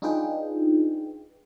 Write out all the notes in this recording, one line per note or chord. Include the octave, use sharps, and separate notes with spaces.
D4 D#4 F4 G#4 B4 G5